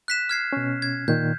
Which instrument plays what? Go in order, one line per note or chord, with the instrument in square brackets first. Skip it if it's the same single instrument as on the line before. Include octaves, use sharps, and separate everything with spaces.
[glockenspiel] F#6 B6 E7
F6 G#6 C7
[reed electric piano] B2 C#4
[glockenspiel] G#6
[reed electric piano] A#2 D#3 [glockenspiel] G6